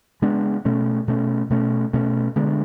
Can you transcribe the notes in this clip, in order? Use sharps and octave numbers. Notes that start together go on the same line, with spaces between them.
C#3 G#3 B3 D4
B2 A3 C#4
B2 A3 C#4
B2 A3 C#4
B2 A3 C#4
D3 G#3 B3 D4